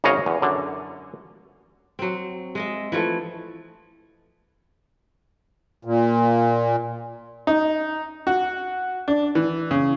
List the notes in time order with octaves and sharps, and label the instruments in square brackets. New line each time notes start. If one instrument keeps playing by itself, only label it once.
[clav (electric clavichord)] G#1 F#2 C#3 C#5 D#5 F5
E2
F#2 D3
[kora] F#3 C4
G#3 D#5 E5
E3 F3 A3
[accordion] A#2
[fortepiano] D#4
F#4
D4
E3
C#3